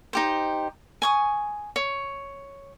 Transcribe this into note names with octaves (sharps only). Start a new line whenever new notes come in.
D#4 G4 C5
G#5 C#6 D#6
C#5